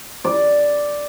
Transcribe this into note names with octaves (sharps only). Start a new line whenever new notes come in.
D5